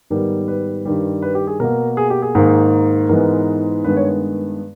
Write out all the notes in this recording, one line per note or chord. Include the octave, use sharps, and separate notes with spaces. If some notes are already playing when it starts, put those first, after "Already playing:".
G#2 D#3 G3 B3 A#4
B4
G2 D#3 G3
B4
G4
G#4
B2 A#3 A#4
G#4
G4
G#4
G#2 D#3 A#3
G#2 E3 G#3 B3 A#4
G2 D#3 G#3 B3 B4
C#5